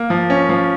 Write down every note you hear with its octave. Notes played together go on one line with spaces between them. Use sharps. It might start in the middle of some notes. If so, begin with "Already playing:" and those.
Already playing: A#3
F3
C#4
F3